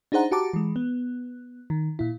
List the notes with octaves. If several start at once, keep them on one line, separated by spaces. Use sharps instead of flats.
D4 D#4 G#4 C5 F#5 A#5
F#4 G4 F#5 A5 A#5 D6
E3 G#3
B3
D#3
A#2 E4